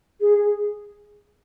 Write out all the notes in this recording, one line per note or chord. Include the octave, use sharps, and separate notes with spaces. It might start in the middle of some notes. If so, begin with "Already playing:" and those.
G#4